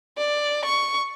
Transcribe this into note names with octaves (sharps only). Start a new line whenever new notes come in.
D5
C#6